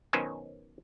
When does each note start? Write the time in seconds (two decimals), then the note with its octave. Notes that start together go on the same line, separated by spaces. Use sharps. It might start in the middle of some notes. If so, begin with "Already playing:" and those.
0.13 B2 D#3 F#3 C#4 C5 G#5